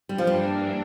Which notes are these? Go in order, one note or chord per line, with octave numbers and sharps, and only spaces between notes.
G3
F3
G2 E3 G3 A#3 D4